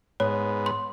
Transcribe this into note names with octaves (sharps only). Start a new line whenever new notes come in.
G#2 B3 C#5
C6